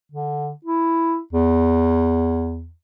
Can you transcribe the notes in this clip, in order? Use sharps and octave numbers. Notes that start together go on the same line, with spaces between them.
D3
E4
E2